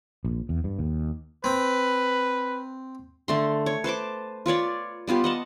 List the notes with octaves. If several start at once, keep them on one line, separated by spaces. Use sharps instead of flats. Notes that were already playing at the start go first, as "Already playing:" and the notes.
A#1
E2
G2
D#2
C4 B4
D3 A3 C6
C#5
B4 C5 A5 D6
F4 B4 C#5 D5
G3 B3 F4 G4
D#5 F#5 A5